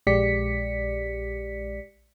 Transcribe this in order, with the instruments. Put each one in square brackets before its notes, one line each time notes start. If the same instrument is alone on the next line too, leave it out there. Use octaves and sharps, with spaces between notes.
[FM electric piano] A#1 G#3 G4 D5 B6 C#7